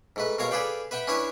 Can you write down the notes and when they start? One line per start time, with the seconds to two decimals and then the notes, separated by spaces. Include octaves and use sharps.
0.16 G#2 A3 B4
0.38 B2 G#3 A#4 C#5 F5 A#5
0.51 G#4 A4 B4 D5 F5 G5
0.91 B4 E5 F#5 G5
1.07 C#4 D4 E4 B4 C#5 G#5